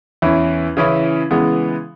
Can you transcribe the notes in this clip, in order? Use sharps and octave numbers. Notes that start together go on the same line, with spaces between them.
E2 E3 C#4 E4
C#3 E3 C#4 E4
C#3 E3 G#3 B3